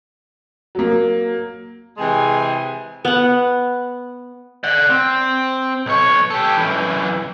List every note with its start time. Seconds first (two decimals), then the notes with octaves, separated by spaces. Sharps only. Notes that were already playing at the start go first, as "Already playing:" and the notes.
0.75 F#3 A#3
1.98 C3 E3 G#3 G#4 G5 G#5
3.05 B3 F#5
4.64 D5 F#5
4.90 C4
5.86 B1 C#5
6.30 G4 A4
6.57 F#2 E3